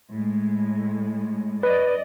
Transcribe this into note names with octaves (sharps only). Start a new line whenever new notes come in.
A2 G#3
F#2 B4 D5 D#5